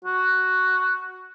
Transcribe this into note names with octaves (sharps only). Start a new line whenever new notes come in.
F#4